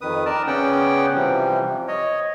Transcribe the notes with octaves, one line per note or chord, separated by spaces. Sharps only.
F2 D#3 B4 D#6
A#4 D5 A5
C#3 B3 C#4 D5 F#5 G5
C3 E3 F3 G3
C#5 D#5